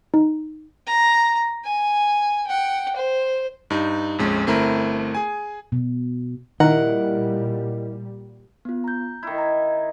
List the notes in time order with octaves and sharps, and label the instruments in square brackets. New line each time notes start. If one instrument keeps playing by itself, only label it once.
[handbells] D#4
[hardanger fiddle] A#5
G#5
F#5 G5
C5
[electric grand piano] G2 D#4
A#1 F2 G#3 C#4
G1 A3 C4 E4 A#4 B5
G#4 G#5
[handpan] B2
[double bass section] A#2 G3 [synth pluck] D#3 A#5 [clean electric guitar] E4 A#4 D#5 [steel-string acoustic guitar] F#5
[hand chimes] B3 F4
A#5 G6
[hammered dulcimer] D#3 E4
[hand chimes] A#5